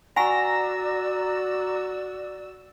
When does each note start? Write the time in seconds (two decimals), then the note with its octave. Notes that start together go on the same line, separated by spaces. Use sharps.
0.16 F#4 D5 F#5 G#5 A#5 C#6 E6 A#6